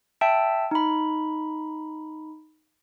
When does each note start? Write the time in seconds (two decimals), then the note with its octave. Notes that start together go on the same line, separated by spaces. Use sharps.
0.21 E5 G5 A5 E6
0.71 D#4 B5